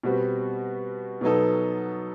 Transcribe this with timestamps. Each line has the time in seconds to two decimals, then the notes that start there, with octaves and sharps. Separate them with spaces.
0.03 B2 G3 C4 F#4 B4
1.21 B2 F#3 B3 D#4 A4